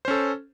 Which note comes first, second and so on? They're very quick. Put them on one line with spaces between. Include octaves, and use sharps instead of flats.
C5 C#4 A4